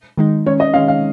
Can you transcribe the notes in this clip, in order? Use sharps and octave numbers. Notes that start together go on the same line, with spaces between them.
D#3 G#3 D#4
D#3 G#3 C#4 C#5
D#5
D#3 G#3 C#4 F5
F5